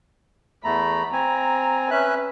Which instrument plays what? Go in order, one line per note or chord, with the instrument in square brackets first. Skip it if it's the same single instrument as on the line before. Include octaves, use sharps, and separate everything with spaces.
[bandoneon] E2 A3 A#5 [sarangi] B5
[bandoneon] C4 G#5 [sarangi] A#5
[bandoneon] C#4 E5 F#6 [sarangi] B4